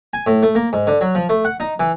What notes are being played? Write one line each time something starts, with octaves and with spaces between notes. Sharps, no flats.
G#5
A2
A3
A#3
G#2
D3
F#3
F3
A3
F#5
D#4
E3